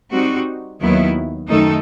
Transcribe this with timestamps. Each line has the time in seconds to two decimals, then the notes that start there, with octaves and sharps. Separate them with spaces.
0.12 G3 C4 D#4 F#4
0.81 D#2 D#3 F#3 B3 E4
1.49 F#2 D#3 A3 D#4 A4